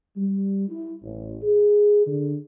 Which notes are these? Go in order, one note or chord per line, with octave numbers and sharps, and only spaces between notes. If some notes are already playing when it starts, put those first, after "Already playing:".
G3
E4
A1
G#4
D3